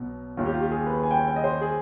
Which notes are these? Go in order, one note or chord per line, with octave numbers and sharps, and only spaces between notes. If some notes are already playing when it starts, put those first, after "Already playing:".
Already playing: B1 B2
D#2 D#3 F4
G4
F4
G4
G#4
B4
G#5
G5
G#5
G5
D#5
C5
G#4